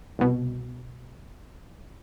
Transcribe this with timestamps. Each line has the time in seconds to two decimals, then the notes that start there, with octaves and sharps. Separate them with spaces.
0.19 C2 B2